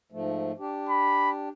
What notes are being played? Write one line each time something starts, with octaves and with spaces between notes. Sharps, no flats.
G#2 F3 A3
D4 G4
B5